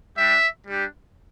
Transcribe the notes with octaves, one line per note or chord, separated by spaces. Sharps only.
G3 D4 G4 E5
G3 D4 G4